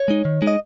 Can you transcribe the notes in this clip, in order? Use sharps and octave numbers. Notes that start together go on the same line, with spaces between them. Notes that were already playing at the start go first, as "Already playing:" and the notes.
Already playing: C#5
G#3 D#4
D#3
G#3 D#4
D#5